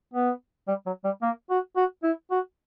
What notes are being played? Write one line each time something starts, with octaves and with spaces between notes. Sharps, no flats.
B3
G3
F#3
G3
A#3
F#4
F#4
E4
F#4